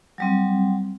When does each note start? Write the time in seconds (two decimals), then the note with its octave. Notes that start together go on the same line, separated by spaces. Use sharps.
0.18 F#3 G3 C4